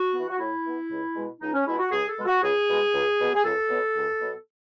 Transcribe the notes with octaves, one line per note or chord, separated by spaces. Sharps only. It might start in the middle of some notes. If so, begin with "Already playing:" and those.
Already playing: F#4
E3 B3
F#4
A2 E4
E3 B3
C#2
B2 G#3
C#2 D#4
C#4
B2 G#3 E4
F#4
C#2 G#4
A4
B2 G#3
F#4
C#2 G#4
B2 G#3
C#2
B2 F#3 B3
G#4
C#2 A4
B2 F#3 B3
C#2
B2 F#3 B3